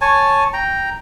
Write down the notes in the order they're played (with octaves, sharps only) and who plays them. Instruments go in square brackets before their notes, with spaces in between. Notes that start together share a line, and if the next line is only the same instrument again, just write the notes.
[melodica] C#5 G#5 A5
G5 A#5